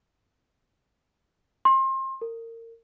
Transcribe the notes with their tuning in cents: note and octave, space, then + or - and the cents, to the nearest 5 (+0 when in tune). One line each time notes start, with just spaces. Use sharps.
C6 +30
A#4 -30